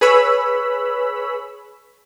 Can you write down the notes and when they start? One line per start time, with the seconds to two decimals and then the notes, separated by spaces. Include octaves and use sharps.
0.01 G#4 B4 C#5 B5 E6